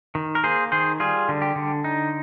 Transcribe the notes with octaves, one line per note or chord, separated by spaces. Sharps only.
D#3
A#4
A#3 G#4 C5
D#3 G#4 C5
G3 F4 G#4
D3
G4
D3
D#4